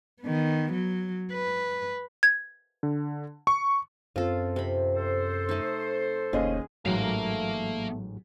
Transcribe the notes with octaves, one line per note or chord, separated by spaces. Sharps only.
D#3 B3
F#3
B4
G#6
D3
C#6
F#2 C4 F4 A4
C3 B5
A4 C5
A3 D#4
F1 D#2 C#4 G#4 D#5
A1 G#2 F#3 A3 A#3 F5